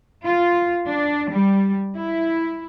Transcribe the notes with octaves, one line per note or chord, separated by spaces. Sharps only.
F4
D4
G3
E4